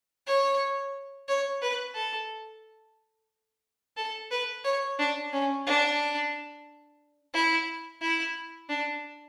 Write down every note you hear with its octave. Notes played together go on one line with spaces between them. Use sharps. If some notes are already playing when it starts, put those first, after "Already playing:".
C#5
C#5
B4
A4
A4
B4
C#5
D4
C#4
D4
E4
E4
D4